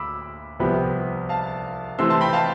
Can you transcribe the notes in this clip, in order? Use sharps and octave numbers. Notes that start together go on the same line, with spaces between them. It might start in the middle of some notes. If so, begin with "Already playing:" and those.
Already playing: D2 B5 D6 E6
C2 C3 F3 B3 G5 B5
F5 A5
C3 E3 A3 C4 C6 E6
A5 C6
G5 B5
F5 A5